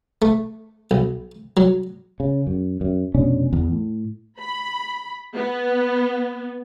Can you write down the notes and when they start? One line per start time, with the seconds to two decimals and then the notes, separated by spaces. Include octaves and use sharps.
0.22 A3
0.91 B1
1.57 F#3
2.20 C#3
2.47 F#2
2.81 F#2
3.15 F1 B2 C#4 D4
3.53 E2
3.71 A2
4.38 B5
5.33 B3